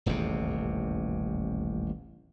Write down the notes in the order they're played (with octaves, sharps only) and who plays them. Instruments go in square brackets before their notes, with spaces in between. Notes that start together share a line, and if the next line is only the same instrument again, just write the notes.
[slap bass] D#1 A1 E2 C3